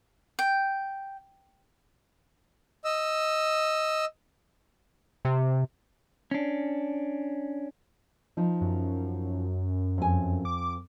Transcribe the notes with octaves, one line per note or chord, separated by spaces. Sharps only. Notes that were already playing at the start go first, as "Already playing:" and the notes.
G5
D#5 E6
C3
C#4 D4
F3 D#4
F#2
F2 G#5
D6